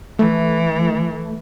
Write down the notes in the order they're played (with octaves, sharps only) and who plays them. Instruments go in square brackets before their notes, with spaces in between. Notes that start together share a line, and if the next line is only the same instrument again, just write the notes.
[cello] E3 [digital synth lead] A3